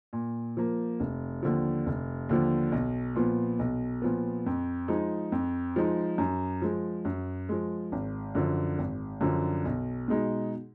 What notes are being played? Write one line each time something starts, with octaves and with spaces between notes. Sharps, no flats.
A#2
F3 A#3
F1
D#2 D3 F3
F1
D#2 D3 F3
B1
A#2 F3 B3
B1
A#2 F3 B3
F2
F3 G#3 D#4
F2
F3 G#3 D#4
F#2
F3 G#3
F#2
F3 G#3
G#1
F#2 D3 F3
G#1
F#2 D3 F3
B1
B2 G#3 D#4